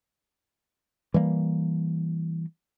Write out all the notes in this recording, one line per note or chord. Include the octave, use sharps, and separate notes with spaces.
E3 G3 A3 A#3